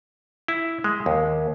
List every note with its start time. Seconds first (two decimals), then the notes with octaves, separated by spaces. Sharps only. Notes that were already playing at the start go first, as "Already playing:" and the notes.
0.48 E4
0.84 G#3
1.06 D#2